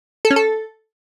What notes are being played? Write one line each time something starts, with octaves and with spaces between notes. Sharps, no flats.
A4
C#4
A4